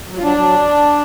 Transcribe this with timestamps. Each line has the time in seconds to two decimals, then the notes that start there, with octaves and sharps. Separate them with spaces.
0.08 F#3
0.18 F4
0.23 F#3 D4
0.38 F#3